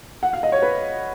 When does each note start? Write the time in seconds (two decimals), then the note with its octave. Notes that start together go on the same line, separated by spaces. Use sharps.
0.23 F#5
0.33 F5
0.43 D#5
0.52 C#5
0.62 B4